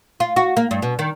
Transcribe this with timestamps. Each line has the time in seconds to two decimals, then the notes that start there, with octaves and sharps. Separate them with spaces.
0.20 F4
0.36 F#4
0.57 A#3
0.71 G2
0.82 B2
0.99 D#3